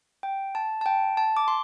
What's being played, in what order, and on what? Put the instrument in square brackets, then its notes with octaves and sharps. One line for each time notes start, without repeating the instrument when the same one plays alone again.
[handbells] G5
A5
A5
G5
A5
D6
C6